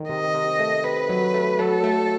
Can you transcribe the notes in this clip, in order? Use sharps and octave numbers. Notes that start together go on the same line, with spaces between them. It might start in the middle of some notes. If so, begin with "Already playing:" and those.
Already playing: D#3
C3 D#5
C3
A3
C3 B4
F#3
A3
F#3 A4
A3